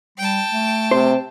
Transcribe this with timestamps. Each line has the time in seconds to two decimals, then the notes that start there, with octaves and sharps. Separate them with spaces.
0.18 G3 G5 A5
0.51 A3
0.91 C3 C5